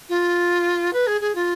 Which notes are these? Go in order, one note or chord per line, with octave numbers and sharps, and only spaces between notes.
F4
B4
G#4
G#4
F4